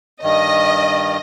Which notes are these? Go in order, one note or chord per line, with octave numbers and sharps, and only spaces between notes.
G2 D#3 D#5